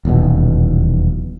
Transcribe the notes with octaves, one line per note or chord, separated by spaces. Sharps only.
D#1 B1 E2 B2